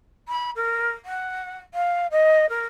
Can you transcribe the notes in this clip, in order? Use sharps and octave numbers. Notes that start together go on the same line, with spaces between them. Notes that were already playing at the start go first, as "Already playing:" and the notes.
B5
A#4
F#5
F5
D#5
A#4